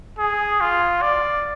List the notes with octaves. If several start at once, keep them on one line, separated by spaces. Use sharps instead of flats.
G#4
F4
D5